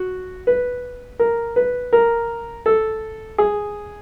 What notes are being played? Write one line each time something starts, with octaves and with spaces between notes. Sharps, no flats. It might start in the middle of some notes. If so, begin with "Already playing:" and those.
Already playing: F#4
B4
A#4
B4
A#4
A4
G#4